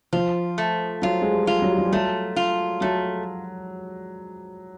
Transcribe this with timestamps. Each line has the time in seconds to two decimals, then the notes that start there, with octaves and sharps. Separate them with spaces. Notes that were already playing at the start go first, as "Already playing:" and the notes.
0.13 F3 F4
0.58 A3
1.02 F#3 F4
1.22 G#3
1.33 G3
1.47 F4
1.62 F#3
1.71 G3
1.78 F#3
1.86 G3
1.93 F#3 A3
2.36 F4
2.81 F#3 A3